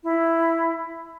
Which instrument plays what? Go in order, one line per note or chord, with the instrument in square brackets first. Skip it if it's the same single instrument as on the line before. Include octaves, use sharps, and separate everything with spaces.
[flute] E4